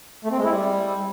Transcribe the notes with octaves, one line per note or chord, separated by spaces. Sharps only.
A3
C4
G#3
E4
G3